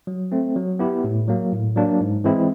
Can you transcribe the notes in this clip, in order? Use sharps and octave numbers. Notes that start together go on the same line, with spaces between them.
F#3
A3 C4
F#3
B3 E4 G4
A2
F#3 A#3
A2
F#3 A#3 D4
G#2
E3 G#3 C4 E4